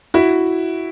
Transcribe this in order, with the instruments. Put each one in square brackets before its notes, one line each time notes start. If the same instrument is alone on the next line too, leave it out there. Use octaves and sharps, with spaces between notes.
[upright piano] E4 F#4